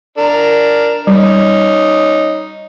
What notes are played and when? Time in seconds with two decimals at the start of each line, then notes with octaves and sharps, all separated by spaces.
0.18 D4 A#4
1.07 G3 C#4 D#4